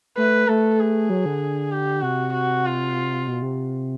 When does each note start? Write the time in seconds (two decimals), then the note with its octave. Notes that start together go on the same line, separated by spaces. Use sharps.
0.17 A3 B4
0.48 A3 A4
0.80 G#4
1.10 F#3
1.26 D3
1.72 G4
2.03 C3 F#4
2.34 F#4
2.65 F4
3.27 B2
3.42 C3